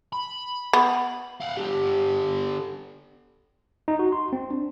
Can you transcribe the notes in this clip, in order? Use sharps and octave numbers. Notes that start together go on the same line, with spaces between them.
B5
B3
F5 F#5
D3 G4
D#4
F#4
C6
C4
D4